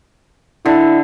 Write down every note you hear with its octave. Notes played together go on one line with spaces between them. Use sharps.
D3 E4